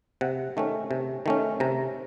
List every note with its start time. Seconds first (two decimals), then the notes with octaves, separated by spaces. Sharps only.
0.21 C3 F#5
0.57 D#3 A3 C#4
0.91 C3
1.26 D#3 A3 C#4
1.60 C3 A#5